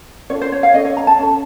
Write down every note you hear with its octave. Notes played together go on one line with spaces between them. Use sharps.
C#4 F4 A4 C#5
C5
C#5
F5
C#4 A4 D#5
C#5
A#5
A5
C#4 A4